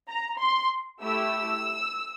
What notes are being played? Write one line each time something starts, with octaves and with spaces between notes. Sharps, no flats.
A#5
C6
A3 E4 G4 E6